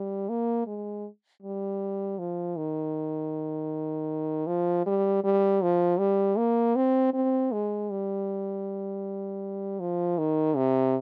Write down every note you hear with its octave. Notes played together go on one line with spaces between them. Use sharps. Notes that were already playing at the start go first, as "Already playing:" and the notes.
Already playing: G3
A#3
G#3
G3
F3
D#3
F3
G3
G3
F3
G3
A#3
C4
C4
G#3
G3
F3
D#3
C3